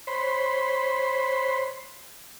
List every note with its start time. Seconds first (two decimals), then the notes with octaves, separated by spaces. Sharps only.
0.07 C5 C#5 B5 C6